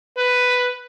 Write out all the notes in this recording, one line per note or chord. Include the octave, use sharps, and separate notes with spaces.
B4